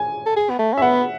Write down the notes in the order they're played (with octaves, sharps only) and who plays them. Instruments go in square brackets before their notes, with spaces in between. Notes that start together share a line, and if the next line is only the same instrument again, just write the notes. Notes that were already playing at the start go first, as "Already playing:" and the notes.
Already playing: [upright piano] G#5
[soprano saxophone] A4
G#4
B3
A3
C#4
[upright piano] E5
[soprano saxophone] B3 [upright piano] F#5